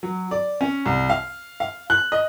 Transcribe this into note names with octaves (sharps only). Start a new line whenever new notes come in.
F#3
D5
C#4
C2
F5
F5
F#6
D#5